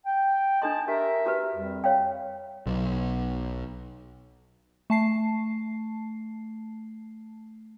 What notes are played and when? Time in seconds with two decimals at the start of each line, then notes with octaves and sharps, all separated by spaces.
0.06 G5
0.62 D4 A4 D#5 A5 C6
0.88 G4 A#4 E5
1.26 F#4 G4 B4
1.55 F2 G3
1.84 C#5 F5 G5
2.66 B1
4.90 A3 A5 C7